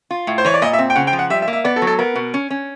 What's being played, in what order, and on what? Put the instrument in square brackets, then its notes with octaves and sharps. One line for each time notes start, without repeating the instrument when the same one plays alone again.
[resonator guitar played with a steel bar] F4
A2
[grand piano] C5
[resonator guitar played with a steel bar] E3 [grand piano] C#5
[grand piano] D5
[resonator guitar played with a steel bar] A#2 [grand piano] D#5
[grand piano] E5
[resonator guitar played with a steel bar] C4
[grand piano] G5
[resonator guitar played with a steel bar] C#3 [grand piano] F#5
[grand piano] G5
[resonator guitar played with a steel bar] F3
[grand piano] F#5
[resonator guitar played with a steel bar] G3 [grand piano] E5
[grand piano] E5
[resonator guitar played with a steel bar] A#3
[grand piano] E5
[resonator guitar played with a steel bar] B3 [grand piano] D5
[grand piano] A4
[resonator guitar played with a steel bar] F#3
[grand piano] A4
[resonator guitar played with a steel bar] B3 [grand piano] A#4
[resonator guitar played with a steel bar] B2
C#4
C#4